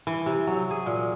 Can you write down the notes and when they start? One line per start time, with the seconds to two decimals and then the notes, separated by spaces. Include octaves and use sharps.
0.07 E3
0.26 C3
0.47 F#3
0.71 G#4
0.86 A#2